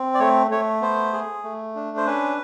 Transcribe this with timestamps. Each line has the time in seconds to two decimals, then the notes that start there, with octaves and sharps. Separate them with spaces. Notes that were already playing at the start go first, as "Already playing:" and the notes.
Already playing: C4
0.14 D5
0.20 A3 C#5
0.51 A3 C#5
0.81 B3 C5
1.13 G#4
1.43 A3
1.75 D4
1.97 C5
2.07 C#4 B4